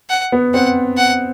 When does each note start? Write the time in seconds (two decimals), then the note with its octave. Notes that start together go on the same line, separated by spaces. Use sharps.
0.10 F#5
0.32 B3
0.54 C4 F#5
0.98 F#5